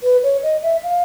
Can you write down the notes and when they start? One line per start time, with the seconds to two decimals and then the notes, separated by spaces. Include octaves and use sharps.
0.03 B4
0.23 C#5
0.43 D#5
0.63 E5
0.83 F5